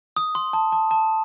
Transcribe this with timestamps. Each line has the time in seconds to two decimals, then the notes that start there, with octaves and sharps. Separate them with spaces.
0.16 D#6
0.35 C6
0.53 A5
0.72 A5
0.91 A5